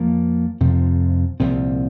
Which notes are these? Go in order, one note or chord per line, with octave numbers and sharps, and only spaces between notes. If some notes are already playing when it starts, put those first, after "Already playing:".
Already playing: F2 F3 A#3
F2 C3 F3 C4
C2 A#2 F3 C4